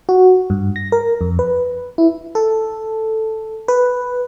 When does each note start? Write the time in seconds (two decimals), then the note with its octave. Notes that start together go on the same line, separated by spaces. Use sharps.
0.09 F#4
0.50 G2
0.76 A#6
0.92 A#4
1.21 F2
1.39 B4
1.98 E4
2.35 A4
3.68 B4